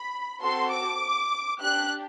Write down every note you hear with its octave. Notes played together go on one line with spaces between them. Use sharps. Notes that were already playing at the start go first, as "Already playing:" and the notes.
Already playing: B5
C4 F#4 A4 C6
D6
D4 G4 F#6